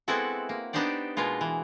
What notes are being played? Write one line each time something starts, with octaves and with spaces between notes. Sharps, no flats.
G#3 B3 C4 E4 F#4 A4
A#3
B3 D4 D#4 G4 C5 D5
B2 G#3 A#3 B3 F4
E3